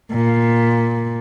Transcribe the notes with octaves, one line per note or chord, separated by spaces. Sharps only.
A#2